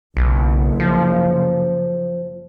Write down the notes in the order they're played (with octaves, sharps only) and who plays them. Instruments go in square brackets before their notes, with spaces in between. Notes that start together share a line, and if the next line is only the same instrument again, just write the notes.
[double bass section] F#1 [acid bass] B1
[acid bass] F3